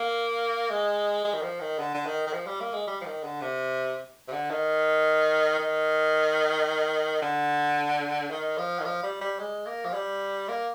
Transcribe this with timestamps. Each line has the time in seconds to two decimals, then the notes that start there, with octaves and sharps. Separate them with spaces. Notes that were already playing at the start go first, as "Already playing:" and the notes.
Already playing: A#3
0.70 G#3
1.25 G#3
1.34 D#3
1.42 F3
1.60 D#3
1.79 D3
1.94 D3
2.06 D#3
2.27 D#3
2.33 F3
2.47 G3
2.60 A#3
2.73 G#3
2.87 G3
3.01 F3
3.05 D#3
3.24 D3
3.41 C3
4.28 C3
4.32 D3
4.50 D#3
5.59 D#3
7.22 D3
8.30 D#3
8.58 F3
8.79 D#3
8.85 F3
9.03 G3
9.21 G3
9.39 G#3
9.66 A#3
9.85 F3
9.93 G3
10.48 A#3